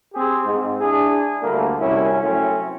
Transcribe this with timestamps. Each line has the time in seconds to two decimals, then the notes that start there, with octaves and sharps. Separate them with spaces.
0.13 C4 G4 G#4
0.45 G#2
0.79 D4 E4 G#4
1.41 D2 G3 A3 A#3
1.80 C2 F#2 G3 C#4 E4
2.22 F#3 A3 C4 C#4 E4